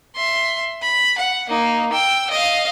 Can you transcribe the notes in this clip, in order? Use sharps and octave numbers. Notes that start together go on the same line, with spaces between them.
E5 C6
B5
F#5
A#3 D#4
G5 E6
D#5 F5